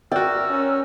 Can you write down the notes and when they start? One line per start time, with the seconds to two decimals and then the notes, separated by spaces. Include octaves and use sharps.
0.12 F#4 A#4 D5 G5 E6 F6
0.50 C#4